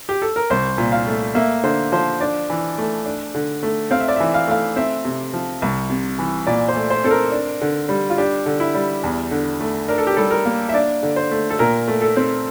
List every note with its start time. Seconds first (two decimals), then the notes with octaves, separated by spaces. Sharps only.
0.09 G4
0.22 A4
0.36 A#4
0.50 C2 C5
0.78 A#2
0.92 F5
1.07 A3
1.35 A#3 E5
1.63 D3 C5
1.92 F3 C5
2.21 D4 D5
2.50 E3
2.78 A3
3.06 D4
3.35 D3
3.63 A3
3.91 C4 F5
4.00 E5
4.08 D5
4.16 E3 E5
4.34 F5
4.48 A3 F5
4.76 C4 E5
5.05 C3
5.33 F3
5.62 C2
5.90 C3
6.19 E3
6.47 A#2 D5
6.68 C5
6.76 A3
6.90 C5
7.04 C4 A4
7.11 A#4
7.32 D4
7.62 D3
7.89 G3
8.10 F4
8.18 D4 G4
8.46 D3
8.60 E4
8.75 G3
9.04 E2
9.31 D3
9.60 A3
9.89 D4 A#4
9.98 A4
10.07 G4
10.17 G3 A4
10.31 A#4
10.46 A#3
10.69 E5
10.73 D4 D5
11.03 D3
11.16 C5
11.31 A3
11.50 A4
11.59 A#2 A#4
11.88 A3
12.02 A4
12.17 C4